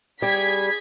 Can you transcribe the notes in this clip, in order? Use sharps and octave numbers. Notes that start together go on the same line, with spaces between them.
G3 G#4 G#6 B6